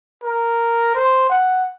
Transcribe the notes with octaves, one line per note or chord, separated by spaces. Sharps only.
A#4
C5
F#5